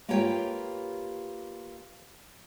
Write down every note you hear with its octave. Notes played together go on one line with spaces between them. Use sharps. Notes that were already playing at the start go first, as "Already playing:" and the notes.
A#3 F4 G4 B4 C#5 G5